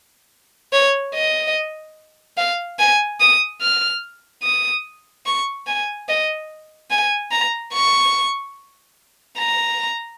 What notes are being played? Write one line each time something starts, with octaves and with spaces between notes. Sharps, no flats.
C#5
D#5
F5
G#5
D#6
F6
D#6
C#6
G#5
D#5
G#5
A#5
C#6
A#5